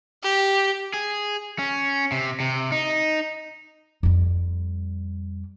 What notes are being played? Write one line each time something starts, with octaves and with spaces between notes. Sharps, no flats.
G4
G#4
C#4
C3
C3
D#4
F2 G3